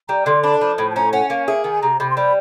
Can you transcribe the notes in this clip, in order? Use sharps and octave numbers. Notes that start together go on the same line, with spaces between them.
G3 A#5
D3 C6
D4 B5
F3 B5
A2 B5
A5
C#4 A#5
C#4 F#5
A#3 F5
G#4 E5
D#3 G#5
C3 A#5
C3 B5
C6
G3 B5